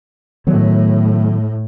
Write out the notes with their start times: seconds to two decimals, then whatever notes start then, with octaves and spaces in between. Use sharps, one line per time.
0.47 A2 D#3 F#3 B3